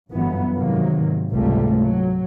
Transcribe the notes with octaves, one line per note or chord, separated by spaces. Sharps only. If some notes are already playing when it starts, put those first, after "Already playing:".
G1 F#2 E3 F#3 B3
G#2 C3 D#3 F#3 A#3
G#1 C#2 C3 G3 A3 A#3
F#3